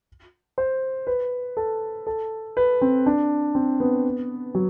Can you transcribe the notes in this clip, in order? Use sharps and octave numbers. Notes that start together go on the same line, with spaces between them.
C5
B4
A4
A4
B4
C4
D4
C4
B3
F#3